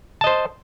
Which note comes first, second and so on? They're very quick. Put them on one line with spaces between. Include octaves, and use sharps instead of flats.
A5 D#5 C5